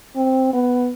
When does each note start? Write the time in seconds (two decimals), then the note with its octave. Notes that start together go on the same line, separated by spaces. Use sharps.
0.16 C4
0.53 B3